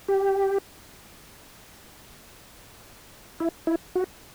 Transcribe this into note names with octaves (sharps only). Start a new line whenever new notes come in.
G4
E4
E4
F#4